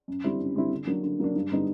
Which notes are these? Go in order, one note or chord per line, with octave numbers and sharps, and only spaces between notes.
F#2
D3 G3 C4 E4
F#2
D3 G3 C4 E4
D3
F#3 A#3 D4
D3
F#3 A#3 D4
G2
D3 G3 B3 D#4